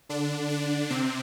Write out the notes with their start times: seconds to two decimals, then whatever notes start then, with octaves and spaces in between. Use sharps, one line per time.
0.09 D3 D4
0.50 D3 D4
0.90 C3 C4